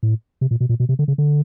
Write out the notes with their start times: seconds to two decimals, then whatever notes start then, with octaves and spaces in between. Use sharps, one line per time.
0.03 A2
0.41 C3
0.51 A#2
0.61 B2
0.69 A#2
0.80 B2
0.89 C3
0.99 D3
1.08 C#3
1.18 D3